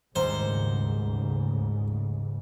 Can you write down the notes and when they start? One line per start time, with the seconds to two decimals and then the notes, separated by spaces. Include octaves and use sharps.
0.16 D#1 D2 G#2 C#3 C5 A#5 C#7